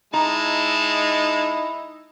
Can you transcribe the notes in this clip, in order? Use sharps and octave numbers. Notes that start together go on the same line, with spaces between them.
G#3 D#4 E4 A5 A#5